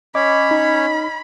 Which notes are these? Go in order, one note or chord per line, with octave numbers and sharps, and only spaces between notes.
C#4 C#5 D#5 B5 D6
D#4